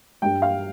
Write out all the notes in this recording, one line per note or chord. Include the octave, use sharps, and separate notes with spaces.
G2 G3 G5
F5